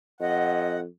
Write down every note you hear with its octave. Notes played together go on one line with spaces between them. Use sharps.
F2 D#5 F#5